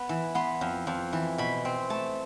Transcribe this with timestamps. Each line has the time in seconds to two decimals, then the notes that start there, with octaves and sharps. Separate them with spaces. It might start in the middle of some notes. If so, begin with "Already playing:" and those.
Already playing: B3
0.09 E3
0.35 B3 C6
0.61 F2
0.87 F2
1.13 E3
1.38 B2 B5
1.65 C4
1.90 A3 A5